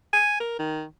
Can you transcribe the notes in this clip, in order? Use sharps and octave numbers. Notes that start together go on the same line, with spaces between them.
G#5
A#4
D#3